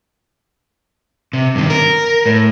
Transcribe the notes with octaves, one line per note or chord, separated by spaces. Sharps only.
C3
G2 D#3
A#4
A2